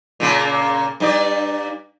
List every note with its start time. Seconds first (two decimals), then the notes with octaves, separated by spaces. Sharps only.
0.20 A#2 C#3 A#3
1.00 G2 D#4 D5